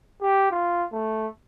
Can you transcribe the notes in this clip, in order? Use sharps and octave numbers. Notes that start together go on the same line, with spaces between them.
G4
F4
A3